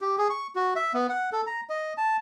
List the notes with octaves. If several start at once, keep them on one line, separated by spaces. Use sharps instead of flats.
G4
G#4
C#6
F#4
E5
B3
F#5
A4
A#5
D#5
A5